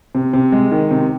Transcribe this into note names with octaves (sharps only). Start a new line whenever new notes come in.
C3
C3
G#3
D#3
C3